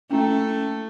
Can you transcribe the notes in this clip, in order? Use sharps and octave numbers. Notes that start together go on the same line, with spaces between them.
A3 C#4 E4 G5